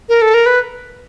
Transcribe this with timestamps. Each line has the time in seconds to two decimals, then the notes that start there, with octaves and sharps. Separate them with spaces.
0.09 A#4
0.22 A4
0.34 A#4
0.46 B4